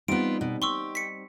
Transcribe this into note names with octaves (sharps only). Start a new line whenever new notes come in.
G3 B3 C4 D#4 F4 D7
B2
G4 C6 C#6 E6
B6 C#7